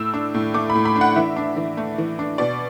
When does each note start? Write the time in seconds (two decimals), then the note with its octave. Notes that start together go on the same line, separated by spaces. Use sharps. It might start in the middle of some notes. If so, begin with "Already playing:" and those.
Already playing: A2 E6
0.14 D4
0.34 A2
0.54 A3 D6
0.70 B5
0.75 A2
0.85 B5
0.96 D4
1.01 F#5
1.16 E3 E5
1.36 D4
1.57 E3
1.77 A3
1.98 E3
2.19 D4
2.38 B2 D5